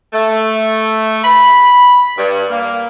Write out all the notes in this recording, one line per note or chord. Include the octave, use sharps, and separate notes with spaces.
A3
B5
G2
A#3